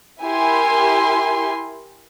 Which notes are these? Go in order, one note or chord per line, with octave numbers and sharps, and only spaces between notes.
E4 G4 A#4 G#5 C6